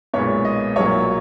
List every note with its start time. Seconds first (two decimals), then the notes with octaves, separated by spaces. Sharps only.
0.13 B1 A#2 G#3 B3 C#5
0.45 D#5
0.76 B1 A#2 F#3 A#3 C#5